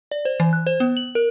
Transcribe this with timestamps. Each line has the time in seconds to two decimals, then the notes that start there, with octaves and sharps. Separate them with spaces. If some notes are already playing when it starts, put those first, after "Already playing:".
0.11 D5
0.25 C5
0.40 E3
0.53 F#6
0.67 C5
0.80 B3
0.97 F#7
1.15 A#4